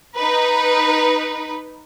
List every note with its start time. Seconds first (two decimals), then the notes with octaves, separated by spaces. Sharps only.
0.16 D#4 B4